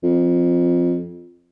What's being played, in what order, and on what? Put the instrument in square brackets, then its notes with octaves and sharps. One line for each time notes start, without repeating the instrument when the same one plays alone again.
[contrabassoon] F2